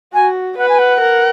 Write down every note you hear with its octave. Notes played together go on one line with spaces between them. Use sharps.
F#4 G#5
B4 F#5
G#5
F#5
A#4